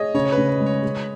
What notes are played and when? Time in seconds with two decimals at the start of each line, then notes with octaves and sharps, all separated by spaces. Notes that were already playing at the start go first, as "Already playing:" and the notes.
Already playing: G#4 C#5 D#5
0.14 C#3 C#5
0.25 C#5
0.32 B4
0.37 C#3
0.48 B4
0.60 G#3
0.66 C#5
0.83 G#3